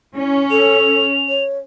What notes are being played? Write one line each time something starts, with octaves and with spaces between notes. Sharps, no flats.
C#4 E4
A4 F7
C#5